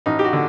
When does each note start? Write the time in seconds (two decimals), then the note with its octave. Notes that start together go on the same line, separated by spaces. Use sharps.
0.06 A1 D#4
0.19 G4
0.25 F#4
0.33 D3